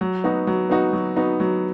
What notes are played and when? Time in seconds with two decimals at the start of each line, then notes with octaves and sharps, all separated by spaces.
0.01 F#3
0.24 B3 D#4 F#4
0.47 F#3
0.70 B3 D#4 F#4
0.93 F#3
1.16 B3 D#4 F#4
1.40 F#3